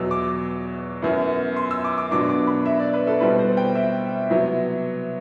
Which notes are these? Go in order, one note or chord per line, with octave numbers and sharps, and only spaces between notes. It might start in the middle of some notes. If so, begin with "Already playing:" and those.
Already playing: E2 B2 F#3 E6
D6
F#2 F#3 B3 E4
C6
E6
D6
D6
B2 F#3 B3 D4 D6
D6
B5
E5
D5
B4
A4
B2 G3 C4 E4 B4
C5
G5
E5
C3 F#3 B3 E4